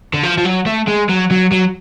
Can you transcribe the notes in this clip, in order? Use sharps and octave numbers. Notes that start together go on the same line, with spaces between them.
D3
F3
F3
F#3
A3
G#3
F#3
F#3
F#3